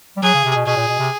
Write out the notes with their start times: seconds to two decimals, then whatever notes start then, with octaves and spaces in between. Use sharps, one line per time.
0.17 G3
0.22 F#3 G#4
0.34 C#3
0.45 C3
0.56 B2
0.66 B2 G#4
0.77 A#2
0.88 B2
0.99 C3